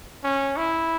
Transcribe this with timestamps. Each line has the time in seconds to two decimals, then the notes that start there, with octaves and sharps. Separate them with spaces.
0.24 C#4
0.57 E4